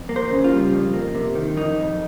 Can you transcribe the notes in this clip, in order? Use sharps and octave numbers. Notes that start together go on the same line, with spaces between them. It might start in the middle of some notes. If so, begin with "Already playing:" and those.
Already playing: F2
A#3
C5
C#3
F4
G3
F2
A#3
C3
D#3
F2 D#4
F2